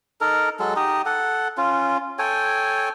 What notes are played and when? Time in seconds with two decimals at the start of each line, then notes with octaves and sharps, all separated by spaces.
0.21 D#4 A4 A#4
0.59 F#3 G#3 A4
0.76 D#4 G4 D#5
1.06 A4 F#5
1.58 C#4 F4
2.19 A4 C#5 G5 G#5